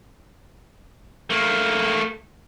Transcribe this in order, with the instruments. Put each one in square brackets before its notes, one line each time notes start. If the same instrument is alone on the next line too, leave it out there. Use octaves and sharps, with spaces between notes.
[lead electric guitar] A3 A#3